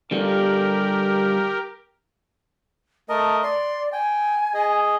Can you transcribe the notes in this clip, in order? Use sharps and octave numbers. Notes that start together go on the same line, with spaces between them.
D3 G3 F4 G4 A#4
A3 A#4 D#5 A5
D5 C6
G5 G#5
G#4 D#5